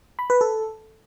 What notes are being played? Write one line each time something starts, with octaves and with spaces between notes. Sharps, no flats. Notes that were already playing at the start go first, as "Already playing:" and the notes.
B5
B4
A4